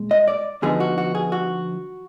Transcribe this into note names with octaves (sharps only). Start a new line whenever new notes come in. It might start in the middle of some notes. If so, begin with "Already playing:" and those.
Already playing: A#2 G#3
D#5
D5
D2 D3 F3 B3 D#4 G#4
F#4
F#4
G#4
F#4